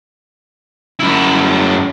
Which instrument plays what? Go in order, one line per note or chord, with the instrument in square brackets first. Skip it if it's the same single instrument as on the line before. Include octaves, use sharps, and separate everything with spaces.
[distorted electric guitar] F#2 E4